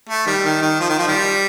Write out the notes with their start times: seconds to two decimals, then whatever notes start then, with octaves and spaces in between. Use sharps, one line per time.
0.09 A3
0.27 D#3 G3
0.45 D#3
0.62 D#3
0.80 F3
0.89 D#3
0.99 F3
1.07 D#3 G3